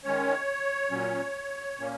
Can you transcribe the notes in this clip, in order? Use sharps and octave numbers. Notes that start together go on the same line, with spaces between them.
D#3 G#3 C#4 C#5
A#2 F#3 C#4
A#2 A#3 C#4